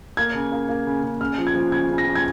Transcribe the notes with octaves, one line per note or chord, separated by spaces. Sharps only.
A#3 G#6
C#3
A#3
A#3
C#3
C#3
C#3 F6
F3
G#6
F3
C#3 G#6
C#3
A#6
F3
G#6